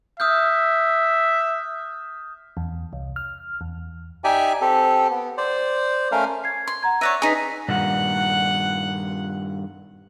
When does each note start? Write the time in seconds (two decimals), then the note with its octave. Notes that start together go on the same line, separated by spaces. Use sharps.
0.20 E5 D#6 F6 G6
2.57 E2
2.93 C2
3.16 F6
3.61 E2
4.24 D#4 G4 D5 E5 G5 G#5
4.61 C4 G4 A4
5.11 B3
5.37 C5 D5
6.12 A3 C#4 A#4 F5
6.44 G#6 C7
6.68 C6
6.83 F#5 A#5 G#6
7.01 C#5 D5 E5 F#6 A#6 D#7
7.22 D#4 G#4 B4 B6
7.68 G2 A#2 D#3 F#5